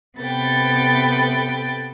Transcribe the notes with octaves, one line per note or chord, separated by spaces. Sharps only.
C3 B3 A4 B4 G5 A6